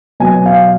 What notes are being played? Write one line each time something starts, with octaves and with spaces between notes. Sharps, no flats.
B2 F#3 G#5
F5